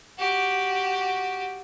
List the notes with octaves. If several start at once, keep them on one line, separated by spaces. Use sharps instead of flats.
F#4 G4